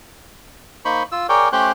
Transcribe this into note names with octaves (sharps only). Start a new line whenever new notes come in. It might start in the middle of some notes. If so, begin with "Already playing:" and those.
A#3 D#4 C5 B5 C#6
F4 E6
G#4 A#4 C#5 D5 G5
A3 C#4 G4 C5 G5 F#6